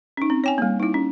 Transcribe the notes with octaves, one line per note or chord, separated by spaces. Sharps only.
C#4 D#4
C4
C#5 G5 G#5
G3 A#3
D#4 E4
C#4